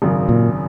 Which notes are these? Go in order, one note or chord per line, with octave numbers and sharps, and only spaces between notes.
G#1 F#2 C#3 F#3
A#2